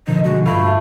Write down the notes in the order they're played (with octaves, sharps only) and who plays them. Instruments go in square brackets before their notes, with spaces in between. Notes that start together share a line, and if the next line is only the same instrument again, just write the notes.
[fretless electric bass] A#2 D#3 F3 [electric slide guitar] D3 [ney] D#5
[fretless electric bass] B2 F3 G#3 [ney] F#4
[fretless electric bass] G2 [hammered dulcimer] A3 [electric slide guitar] F4 [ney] B5